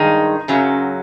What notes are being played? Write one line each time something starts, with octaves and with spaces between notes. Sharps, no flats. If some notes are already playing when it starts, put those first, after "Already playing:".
Already playing: G2 D#3 G#3 D#4
F#2 C#3 F#3